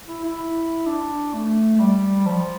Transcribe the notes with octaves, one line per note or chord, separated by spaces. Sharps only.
E4
E4
D4
A3
A3
G3
F3